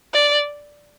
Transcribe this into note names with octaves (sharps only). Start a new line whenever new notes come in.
D5